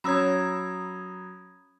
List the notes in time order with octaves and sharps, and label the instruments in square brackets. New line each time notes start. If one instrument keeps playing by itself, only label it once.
[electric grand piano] F#3 A#5 E6 [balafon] C#4 C#5 [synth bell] B5 D#6 G#6